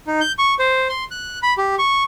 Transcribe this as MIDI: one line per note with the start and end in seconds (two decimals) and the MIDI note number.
0.07 0.20 63
0.21 0.32 91
0.39 0.54 85
0.59 0.88 72
0.89 1.04 84
1.11 1.39 90
1.43 1.53 83
1.58 1.75 67
1.79 2.03 85